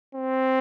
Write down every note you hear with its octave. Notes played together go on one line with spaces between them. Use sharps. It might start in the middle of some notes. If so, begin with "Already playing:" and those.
C4